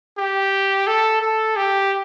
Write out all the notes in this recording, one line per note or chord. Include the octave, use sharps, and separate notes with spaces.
G4
A4
A4
G4